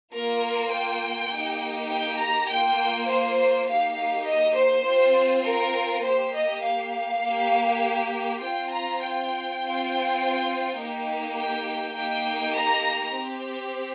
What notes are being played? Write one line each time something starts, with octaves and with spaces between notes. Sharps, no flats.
A#3 F4 A#4
G5
A#3 D#4 G4
G5
A#5
A#3 F4 G5
C5
A#3 D#4 G4 F5
D#5
C5
C4 F4
A#4
A#3 G4 C5
D#5
F5
A#3 G4
C4 F4 G5
A#5
G5
C4 F4
A#3 D#4 G4
G5
A#3 D#4 G4 G5
A#5
C4 G4